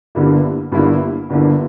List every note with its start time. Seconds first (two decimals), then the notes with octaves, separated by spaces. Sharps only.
0.15 G1 G2 D3 A#3 E4
0.72 G1 G2 D3 A#3 E4
1.30 G1 G2 D3 A#3 E4